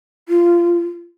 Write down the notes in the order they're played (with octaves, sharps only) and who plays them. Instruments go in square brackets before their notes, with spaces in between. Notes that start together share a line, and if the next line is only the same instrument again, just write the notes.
[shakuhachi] F4